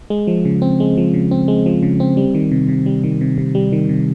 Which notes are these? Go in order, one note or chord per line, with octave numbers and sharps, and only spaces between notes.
G#3
F3
C#3
C4
G#3
F3
C#3
C4
G#3
F3
C#3
C4
G3
D#3
C3
C3
G3
D#3
C3
C3
G3
D#3
C3